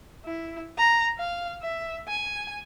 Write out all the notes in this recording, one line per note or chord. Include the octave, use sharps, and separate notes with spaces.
E4
A#5
F5
E5
G#5